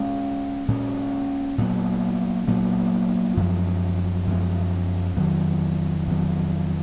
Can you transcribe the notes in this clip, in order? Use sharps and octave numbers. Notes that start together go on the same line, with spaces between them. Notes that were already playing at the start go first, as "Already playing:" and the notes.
Already playing: A#2 G#3 C#4
A#2 G#3 C#4
A#2 F#3 B3
A#2 F#3 B3
F#2 F3 G#3 B3
F#2 F3 G#3 B3
F2 D#3 F#3 B3
F2 D#3 F#3 B3